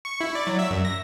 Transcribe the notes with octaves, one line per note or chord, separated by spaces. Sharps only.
C#6
E4
D5
F#3
E5
F#2
A#6